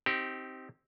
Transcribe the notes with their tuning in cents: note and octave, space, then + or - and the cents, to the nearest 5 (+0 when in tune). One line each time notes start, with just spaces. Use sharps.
C4 +0 D#4 +10 G4 -20